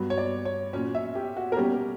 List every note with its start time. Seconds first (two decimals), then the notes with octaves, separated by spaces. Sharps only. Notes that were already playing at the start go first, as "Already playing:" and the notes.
Already playing: G2 F#3 B3
0.10 C#5
0.18 D5
0.45 C#5
0.73 A#2 F#3 C#4 C#5
0.95 E5
1.15 G4
1.37 F#4
1.52 A#4
1.57 B2 G3 A#3 C#4 G4